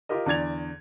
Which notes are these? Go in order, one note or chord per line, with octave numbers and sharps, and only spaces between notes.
F4 G4 A#4 D#5
E2 D3 D5 G#6 F7